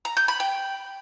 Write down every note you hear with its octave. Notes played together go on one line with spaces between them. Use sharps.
A#5
G6
B5
G5